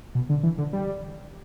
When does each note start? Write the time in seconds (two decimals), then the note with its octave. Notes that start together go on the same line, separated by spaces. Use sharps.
0.15 B2
0.30 D3
0.43 E3
0.58 D3
0.73 G3